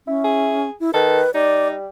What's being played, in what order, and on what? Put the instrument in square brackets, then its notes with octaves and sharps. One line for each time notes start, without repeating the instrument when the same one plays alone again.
[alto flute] C#4 [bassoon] E4
[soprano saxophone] G#4
[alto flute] E4
[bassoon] D#3 [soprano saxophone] A4 [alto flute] B4
[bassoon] G3 [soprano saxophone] D#4 [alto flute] D5